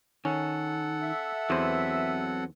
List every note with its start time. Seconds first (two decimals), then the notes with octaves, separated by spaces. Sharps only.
0.25 D#3 C#4 A4 F#5
1.03 E5
1.50 E2 F#3 C4 B4 C5